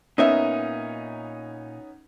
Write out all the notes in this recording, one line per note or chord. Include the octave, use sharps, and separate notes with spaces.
A#2 B3 C#4 D#4 A#4 E5